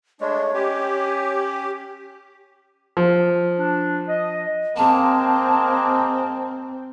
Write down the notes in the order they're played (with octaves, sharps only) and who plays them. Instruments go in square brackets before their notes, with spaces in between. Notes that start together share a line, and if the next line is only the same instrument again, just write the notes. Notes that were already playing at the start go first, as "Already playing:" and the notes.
[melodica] G#3 A3 [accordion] D4 [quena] C#5
[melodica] C#4 [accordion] G4
[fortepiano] F3
[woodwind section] D4
D#5
[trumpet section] G#3 A#3 [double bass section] C4 [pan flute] A5